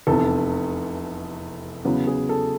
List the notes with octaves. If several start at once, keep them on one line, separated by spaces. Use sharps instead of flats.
F1 E2 C3 A4
E2 C#3 F#3 B3
G#4
A4